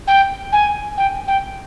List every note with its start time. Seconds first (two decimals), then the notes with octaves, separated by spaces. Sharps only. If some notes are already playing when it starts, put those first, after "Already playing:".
0.07 G5
0.52 G#5
0.97 G5
1.28 G5